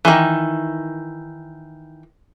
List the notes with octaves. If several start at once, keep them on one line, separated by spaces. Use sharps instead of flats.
D#3 E3